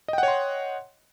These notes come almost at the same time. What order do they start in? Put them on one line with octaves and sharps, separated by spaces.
D#5 G5 F#5 C#5 C6